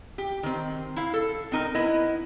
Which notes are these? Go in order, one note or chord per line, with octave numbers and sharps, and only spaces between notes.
G4
D#3 C4
E4 F5
A4
C4 D#4 A#4
B3 E4 D#5